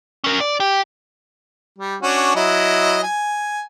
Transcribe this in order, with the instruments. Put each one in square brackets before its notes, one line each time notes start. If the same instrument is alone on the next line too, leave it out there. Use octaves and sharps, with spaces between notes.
[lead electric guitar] C#4 A#4
D5
G4
[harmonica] G3
C#4 D4 F#4
F#3 E4 D#5
G#5